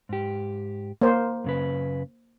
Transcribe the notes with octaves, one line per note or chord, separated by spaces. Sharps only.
G#2 G4
A#3 C5
F#2 C#3 B4